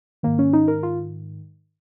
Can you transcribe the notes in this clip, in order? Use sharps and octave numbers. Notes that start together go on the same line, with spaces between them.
G#2 D#3 A#3
C#4
D#4
A#4
F4